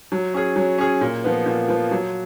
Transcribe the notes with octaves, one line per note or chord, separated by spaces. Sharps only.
F#3
C#4 G#4
F#3
C#4 G#4
A#2
F3 B3
A#2
F3 B3
F#3